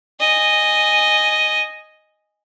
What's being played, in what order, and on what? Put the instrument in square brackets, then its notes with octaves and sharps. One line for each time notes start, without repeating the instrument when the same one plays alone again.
[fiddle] D#5 G#5